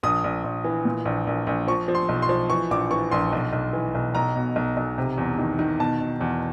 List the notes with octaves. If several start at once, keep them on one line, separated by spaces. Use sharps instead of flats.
A#1 D#6
A#1
A#1
E3
A#2
A#1
A#1
A#1
F3 C#6
F3
C6
B1
C6
F3
E3 C#6
A#1 D6
E3 C#6
A#1 C6
B1
B1
E3
B1
B1 A#5
B2
B1
B1
C3
E2
D#3
D#3
B2 A5
B2
E2